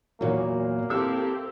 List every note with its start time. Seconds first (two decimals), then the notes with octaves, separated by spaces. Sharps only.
0.21 E2 A#2 F#3 A#3 F#4 C#5
0.90 C4 E4 G4 A4 D6 E6